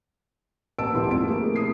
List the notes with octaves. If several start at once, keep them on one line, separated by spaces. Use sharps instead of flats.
A1 A#3 B4 A5 E6 D7
D#1 F3 B3 E4 G4 C6
F2 G#2 F4 D7
A3 A#3 G#4 A4
C3 E4 D#6 C7